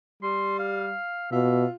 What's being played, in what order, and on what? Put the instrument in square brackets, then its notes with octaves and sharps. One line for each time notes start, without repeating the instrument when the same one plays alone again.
[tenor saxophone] G3 [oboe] C6
[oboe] F5
[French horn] B2 [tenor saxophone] F4 [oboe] E5